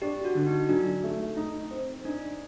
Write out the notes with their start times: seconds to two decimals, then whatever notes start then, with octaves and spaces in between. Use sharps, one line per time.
0.02 D4 G4
0.25 F#4
0.35 D3
0.47 D#4
0.69 F#3 D4
1.03 A3
1.37 D#4
1.71 C4
2.05 D4 D#4